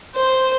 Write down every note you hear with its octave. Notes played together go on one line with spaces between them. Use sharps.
C5